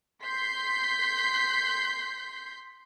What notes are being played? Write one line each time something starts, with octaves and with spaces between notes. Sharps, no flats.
C6 G6 B6 C7